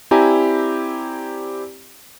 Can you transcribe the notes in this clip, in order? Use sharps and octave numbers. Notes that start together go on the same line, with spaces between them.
C4 E4 G4 D5 G#5 A#5